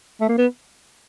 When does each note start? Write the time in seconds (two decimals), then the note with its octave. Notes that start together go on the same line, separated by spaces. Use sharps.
0.21 A3
0.29 A#3
0.38 B3